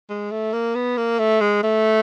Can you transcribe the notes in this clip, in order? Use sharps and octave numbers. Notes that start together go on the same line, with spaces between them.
G#3
A3
A#3
B3
A#3
A3
G#3
A3